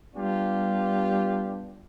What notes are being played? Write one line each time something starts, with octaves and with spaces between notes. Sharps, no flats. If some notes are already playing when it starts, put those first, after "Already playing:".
G3 B3 D4 F4 G4